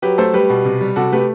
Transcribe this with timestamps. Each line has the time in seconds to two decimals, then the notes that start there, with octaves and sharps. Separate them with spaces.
0.02 F#3 G4 B4
0.18 A3 A4 C5
0.34 G3 G4 B4
0.50 B2
0.65 C3
0.81 G3
0.96 C3 F#4 A4
1.12 A3 G4 B4